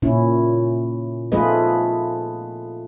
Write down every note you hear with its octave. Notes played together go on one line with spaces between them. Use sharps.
A#2 C#4 E4
F3 A3 F4 G#4 B4 D#5